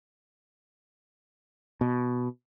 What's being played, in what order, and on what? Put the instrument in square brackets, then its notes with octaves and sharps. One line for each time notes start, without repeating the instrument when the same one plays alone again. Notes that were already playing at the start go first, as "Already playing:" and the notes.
[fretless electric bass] B2